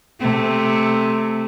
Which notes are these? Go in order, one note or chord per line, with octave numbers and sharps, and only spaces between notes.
C3 A3